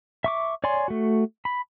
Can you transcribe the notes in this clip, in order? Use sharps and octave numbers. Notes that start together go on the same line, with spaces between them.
E5 C#6 D6
C#5 D5 G#5 C6
A3 F#4
B5